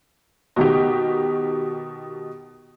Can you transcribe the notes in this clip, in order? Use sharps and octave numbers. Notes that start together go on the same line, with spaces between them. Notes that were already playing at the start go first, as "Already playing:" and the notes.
B2 D#3 G4